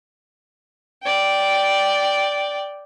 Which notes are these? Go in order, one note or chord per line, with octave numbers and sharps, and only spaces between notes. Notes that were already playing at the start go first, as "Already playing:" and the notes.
D5 G5